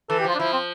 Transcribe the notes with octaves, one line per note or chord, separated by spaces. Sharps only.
E3 A4
G4
F3 F4
D4
F3 E4
C4